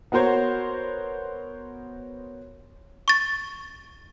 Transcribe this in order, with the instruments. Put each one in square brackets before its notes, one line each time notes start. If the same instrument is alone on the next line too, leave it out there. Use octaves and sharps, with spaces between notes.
[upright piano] B3 F#4 A#4 C5 C#5
[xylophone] C#6 A6